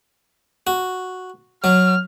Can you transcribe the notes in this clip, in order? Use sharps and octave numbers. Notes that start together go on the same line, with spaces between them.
F#4
F#3 F6